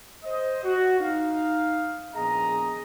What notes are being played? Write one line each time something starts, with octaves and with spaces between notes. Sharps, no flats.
C5 D#5
F#4
D#4 F5
A#1 B3 G#4 D#5 A#5